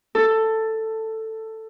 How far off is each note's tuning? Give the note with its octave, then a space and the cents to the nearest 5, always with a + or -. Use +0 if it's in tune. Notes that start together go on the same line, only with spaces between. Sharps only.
A4 +10